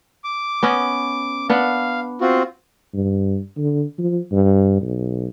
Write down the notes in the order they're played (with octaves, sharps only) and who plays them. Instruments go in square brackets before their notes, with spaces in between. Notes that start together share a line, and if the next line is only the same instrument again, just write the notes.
[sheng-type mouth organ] D6
[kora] B3 C#4 D#5
[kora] B3 D4 [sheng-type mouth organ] F5
[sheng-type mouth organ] C4 F4 F#4
[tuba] G2
D3
F3
G2
B1